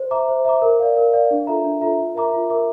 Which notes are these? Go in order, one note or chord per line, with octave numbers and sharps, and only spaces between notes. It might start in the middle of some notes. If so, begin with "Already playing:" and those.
Already playing: C5
E5 A#5 D6
C5
E5 A#5 D6
A#4
D5 F5
A#4
D5 F5
D4
F4 A4 E5 A#5
D4
F4 A4 E5 A#5
F4
A#4 E5 A#5 D6
F4
A#4 E5 A#5 D6